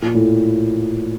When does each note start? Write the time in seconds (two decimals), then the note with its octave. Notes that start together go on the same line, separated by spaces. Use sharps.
0.02 A#2
0.14 A2